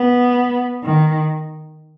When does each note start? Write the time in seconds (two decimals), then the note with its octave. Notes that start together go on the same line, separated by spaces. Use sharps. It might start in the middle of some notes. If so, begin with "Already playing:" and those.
Already playing: B3
0.84 D#3